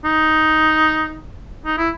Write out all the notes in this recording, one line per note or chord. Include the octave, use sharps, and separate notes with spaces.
D#4
D#4
E4